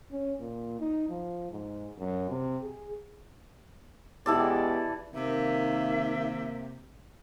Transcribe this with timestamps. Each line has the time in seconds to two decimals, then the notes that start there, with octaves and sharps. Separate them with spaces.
0.11 C#4
0.40 A#2
0.80 D#4
1.09 F3
1.51 G#2
1.99 F#2
2.30 C3
2.62 G#4
4.26 B2 E3 G#3 G4 A4 D5
5.14 C3 D#3 A#3 E5